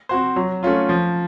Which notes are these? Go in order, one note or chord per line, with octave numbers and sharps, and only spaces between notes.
C4 F#4 C5
F#3
A3 C#4 F4
F3